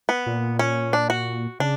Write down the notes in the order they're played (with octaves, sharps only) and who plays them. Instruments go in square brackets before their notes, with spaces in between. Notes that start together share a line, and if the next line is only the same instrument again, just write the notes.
[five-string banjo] B3
[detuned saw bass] A#2
[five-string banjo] C#4
D4
F#4
[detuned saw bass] C#3 [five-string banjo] D4